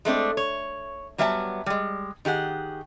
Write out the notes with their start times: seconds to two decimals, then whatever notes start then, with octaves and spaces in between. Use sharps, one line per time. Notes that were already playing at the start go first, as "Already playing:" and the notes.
0.05 G#3 A3 C4 D4
0.37 C#5
1.18 F#3 G3 B3 E5 G5 A5
1.66 G3 G#3
2.25 D#3 G4 G#4 F#5